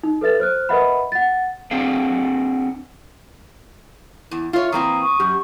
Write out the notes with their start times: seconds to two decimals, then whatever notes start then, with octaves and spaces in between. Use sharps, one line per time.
0.03 D#4
0.21 A4 B4 E5 A6
0.40 C5 F6 F#6
0.69 A#4 B4 D#5 E5 F#5 B5
1.12 F#5 A6
1.71 C4 D4 F#4 G#4 F5
4.31 E2 E4
4.53 F4 C#5 E5
4.72 E3 A#3 C4 A#5 D#6
5.01 C#6
5.20 F#2 G4